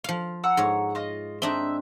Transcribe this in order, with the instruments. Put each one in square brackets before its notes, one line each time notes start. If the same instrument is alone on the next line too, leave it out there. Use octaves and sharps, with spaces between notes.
[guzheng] F3 F5
[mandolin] F#5 A#5 E6
[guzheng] G#2 C#5
[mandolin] F4 D#5
[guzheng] C4 D4 D#4 [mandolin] E5